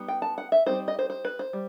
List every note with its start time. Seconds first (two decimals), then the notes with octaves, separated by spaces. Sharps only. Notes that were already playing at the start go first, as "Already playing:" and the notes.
Already playing: G3 B3 D#4
0.08 G5
0.22 A5
0.38 F#5
0.52 E5
0.66 G3 C4 D#4 C5
0.88 D#5
0.99 C5
1.10 C5
1.25 B4
1.39 C5
1.53 G3